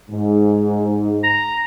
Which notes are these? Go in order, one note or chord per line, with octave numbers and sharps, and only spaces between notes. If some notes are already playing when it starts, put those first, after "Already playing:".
G#2
A#5